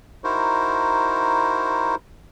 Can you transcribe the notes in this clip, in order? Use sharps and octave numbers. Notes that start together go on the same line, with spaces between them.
D#4 E4 F#4 A#4 C5